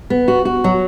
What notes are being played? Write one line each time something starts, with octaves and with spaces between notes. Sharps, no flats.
B3
F#4
F#4
F#3